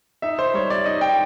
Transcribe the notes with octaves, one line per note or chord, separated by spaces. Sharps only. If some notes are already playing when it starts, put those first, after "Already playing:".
D#4 E5
C5
G3 C#5
D5
D#4 D#5
G5